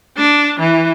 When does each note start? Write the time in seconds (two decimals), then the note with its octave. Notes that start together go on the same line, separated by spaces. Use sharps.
0.18 D4
0.60 E3